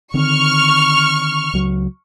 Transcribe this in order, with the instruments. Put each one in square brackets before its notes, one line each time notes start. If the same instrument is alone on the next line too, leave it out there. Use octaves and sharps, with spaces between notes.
[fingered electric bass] D3 D#3 C4 [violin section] C#6 F6
[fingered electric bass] C#2 F#3